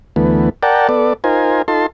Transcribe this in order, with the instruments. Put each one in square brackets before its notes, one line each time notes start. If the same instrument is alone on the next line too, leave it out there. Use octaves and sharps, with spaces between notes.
[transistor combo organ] D2 E3 A3 B3
A#4 D5 F#5 G5 A5
B3 A4 D5
D#4 F4 A#4 C5 G#5
D#4 F4 A4 A5 C6